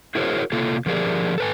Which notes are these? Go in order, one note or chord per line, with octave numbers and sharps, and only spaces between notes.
E4 F#4 G#4 A#4 C5 C#5
C3 A#3 F4 A4
D3 F3 G4 G#4 A#4 D5
A4 B4 G#5